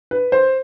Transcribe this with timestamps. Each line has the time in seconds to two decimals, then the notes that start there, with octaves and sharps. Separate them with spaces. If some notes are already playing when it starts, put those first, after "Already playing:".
0.11 B4
0.32 C5